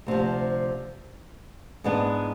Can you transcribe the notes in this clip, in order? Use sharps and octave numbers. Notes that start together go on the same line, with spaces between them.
D2 C3 F3
G#2 E3 G#3 B3 D4